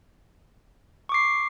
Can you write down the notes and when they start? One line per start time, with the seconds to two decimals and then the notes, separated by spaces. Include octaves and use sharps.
1.09 C#6
1.12 D6
1.14 C7